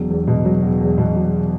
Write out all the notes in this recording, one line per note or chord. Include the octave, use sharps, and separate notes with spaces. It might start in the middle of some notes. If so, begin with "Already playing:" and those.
Already playing: E1 F#3
E2
B2
F#3
E1
E2
B2
F#3